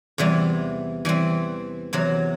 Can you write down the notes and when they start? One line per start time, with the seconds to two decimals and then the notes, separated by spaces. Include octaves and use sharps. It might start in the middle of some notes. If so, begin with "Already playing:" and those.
0.18 E2 C3 E3 G3
1.05 E3 G3 C4
1.93 E2 C3 F#3